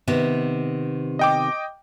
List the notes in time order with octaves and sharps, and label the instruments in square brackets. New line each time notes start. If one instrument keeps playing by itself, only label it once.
[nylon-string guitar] C3 D#3 B3
[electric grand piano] D#5 G5 D6